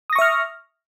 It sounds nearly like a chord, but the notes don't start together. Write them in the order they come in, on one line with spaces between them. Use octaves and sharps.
D#6 A#6 C#6 E5 F6